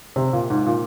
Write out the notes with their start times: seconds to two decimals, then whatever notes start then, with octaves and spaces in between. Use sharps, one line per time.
0.16 C3
0.33 A#2
0.50 G#2
0.66 A#2